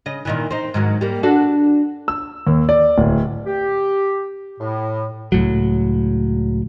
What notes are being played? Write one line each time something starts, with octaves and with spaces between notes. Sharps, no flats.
C#3 D#5
A#2 D#3 E3
C4 D#4
G#2 D#3 F#3
G3 A#3
D4 F#4 A4
E6
D#2
D5
D1
G4
A2
C#2 A2 F#3